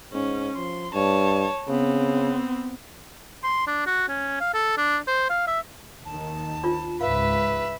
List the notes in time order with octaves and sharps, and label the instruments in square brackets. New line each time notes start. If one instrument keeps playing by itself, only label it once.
[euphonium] G#2 [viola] C#4
[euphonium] F3 [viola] C6
[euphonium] G2 [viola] C#5 A5
[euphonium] C#3 [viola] B3 C4
[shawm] C6
D4
F#4
C#4
F5
A4
D4
C5
F5
E5
[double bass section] D#2 D#3 [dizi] A5
[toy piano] D4 F4 C5
[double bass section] C#2 G#2 [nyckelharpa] B4 [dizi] E5 [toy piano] F5